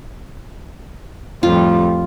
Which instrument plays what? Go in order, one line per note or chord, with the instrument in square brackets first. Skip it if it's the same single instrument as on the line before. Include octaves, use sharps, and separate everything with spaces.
[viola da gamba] F2 A2 G3 [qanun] F4